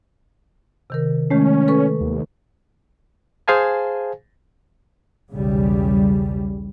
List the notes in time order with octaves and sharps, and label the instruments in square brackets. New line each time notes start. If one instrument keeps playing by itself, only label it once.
[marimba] C3 D#3 A#4
[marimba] D#3 G#3 A3 [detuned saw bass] C#4
[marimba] A4 B4 C#6
[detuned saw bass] D#2
[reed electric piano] G#4 C5 F5 G#5 A5
[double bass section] B1 E2 C#3 G3